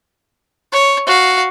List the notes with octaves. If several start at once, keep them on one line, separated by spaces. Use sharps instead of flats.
C#5
F#4 F5